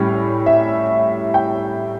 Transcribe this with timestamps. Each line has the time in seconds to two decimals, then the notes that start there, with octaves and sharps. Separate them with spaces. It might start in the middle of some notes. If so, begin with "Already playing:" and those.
Already playing: A2 G3 C#4
0.46 E5
1.34 G5